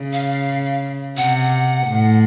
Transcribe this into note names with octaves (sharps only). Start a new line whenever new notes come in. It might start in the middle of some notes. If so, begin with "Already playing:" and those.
Already playing: C#3
F5
C3 F#5
A2